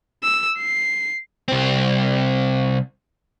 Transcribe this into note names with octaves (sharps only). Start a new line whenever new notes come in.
E6
C7
C2 C4